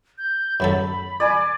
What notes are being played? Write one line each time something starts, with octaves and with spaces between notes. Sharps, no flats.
G6
F#2 F#3 A4 B5
D5 G#5 D6